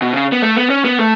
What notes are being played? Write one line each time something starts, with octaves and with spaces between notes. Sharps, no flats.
B2
C#3
B3
A3
B3
C#4
B3
A3